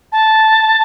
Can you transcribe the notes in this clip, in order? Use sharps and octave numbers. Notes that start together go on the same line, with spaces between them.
A5